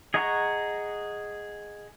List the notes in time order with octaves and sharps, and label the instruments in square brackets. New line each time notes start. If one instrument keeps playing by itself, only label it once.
[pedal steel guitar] G#4 D#5 F#5 A#5 C#6